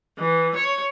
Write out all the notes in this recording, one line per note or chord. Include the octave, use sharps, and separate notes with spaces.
E3
C#5